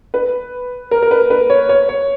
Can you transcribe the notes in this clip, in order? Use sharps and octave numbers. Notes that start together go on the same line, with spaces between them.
B4
A#4
A#4
B4
B4
C#5
C#5
C#5